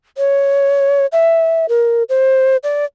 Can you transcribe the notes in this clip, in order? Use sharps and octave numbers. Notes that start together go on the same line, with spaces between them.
C#5
E5
A#4
C5
D5